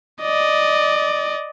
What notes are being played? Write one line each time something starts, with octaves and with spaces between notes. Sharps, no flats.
D5 D#5